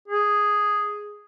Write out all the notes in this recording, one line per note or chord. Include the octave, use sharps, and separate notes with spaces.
G#4